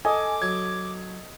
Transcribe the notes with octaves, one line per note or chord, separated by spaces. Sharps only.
A4 D#5 G#5 D6 D#6
F#3 G#6